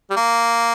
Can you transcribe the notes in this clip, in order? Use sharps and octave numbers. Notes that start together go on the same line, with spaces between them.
G3
A#3